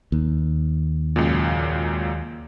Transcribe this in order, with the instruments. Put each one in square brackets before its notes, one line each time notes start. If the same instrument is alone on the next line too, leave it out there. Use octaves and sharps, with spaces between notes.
[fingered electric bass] D#2
[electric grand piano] C#2 F#2 A#2